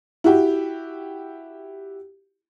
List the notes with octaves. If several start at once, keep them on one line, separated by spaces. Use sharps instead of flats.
E4 F#4 G4